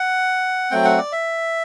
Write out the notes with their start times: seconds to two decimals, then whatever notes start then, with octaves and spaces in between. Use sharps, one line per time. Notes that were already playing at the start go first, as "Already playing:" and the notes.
Already playing: F#5
0.71 F#3 A3 C4 G5
0.85 F#5
0.98 D5
1.12 E5